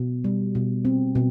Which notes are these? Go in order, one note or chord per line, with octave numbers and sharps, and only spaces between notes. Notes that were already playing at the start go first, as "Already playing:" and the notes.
Already playing: B2
G3
B2
C4
B2